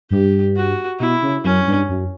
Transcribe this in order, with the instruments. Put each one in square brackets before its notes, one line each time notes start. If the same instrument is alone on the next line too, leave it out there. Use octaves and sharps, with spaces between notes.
[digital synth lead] G2 [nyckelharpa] G4
[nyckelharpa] F#4
[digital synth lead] B2 [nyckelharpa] E4
[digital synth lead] C#3
[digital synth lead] F#2 [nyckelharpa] C#4
[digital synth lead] G2
F#2